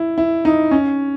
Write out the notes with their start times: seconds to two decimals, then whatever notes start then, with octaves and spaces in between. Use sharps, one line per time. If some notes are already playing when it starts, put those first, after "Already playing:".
Already playing: E4
0.18 E4
0.45 D#4
0.71 C#4